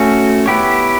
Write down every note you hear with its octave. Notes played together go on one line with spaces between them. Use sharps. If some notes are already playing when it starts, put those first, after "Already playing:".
Already playing: A3 C#4 F#4
B3 E4 G4 C#5